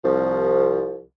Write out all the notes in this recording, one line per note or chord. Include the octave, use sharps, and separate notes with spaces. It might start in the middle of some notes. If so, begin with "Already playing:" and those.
C2 F3